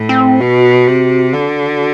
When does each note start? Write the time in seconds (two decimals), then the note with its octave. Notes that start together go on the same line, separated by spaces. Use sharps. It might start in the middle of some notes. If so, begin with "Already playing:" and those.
Already playing: A2
0.09 C4
0.41 B2 F#4
0.87 C3
1.33 D3